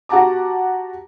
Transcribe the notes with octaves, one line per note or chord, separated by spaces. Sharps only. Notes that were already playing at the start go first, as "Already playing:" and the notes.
F#4 G4 F#5 A5 A#5 D6